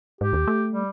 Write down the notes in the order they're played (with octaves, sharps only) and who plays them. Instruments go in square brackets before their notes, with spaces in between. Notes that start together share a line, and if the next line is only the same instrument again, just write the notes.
[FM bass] G#2 [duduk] G4
[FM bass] D#2
A3
[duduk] G3